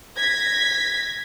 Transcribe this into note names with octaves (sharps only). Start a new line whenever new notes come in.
G#6 A#6 B6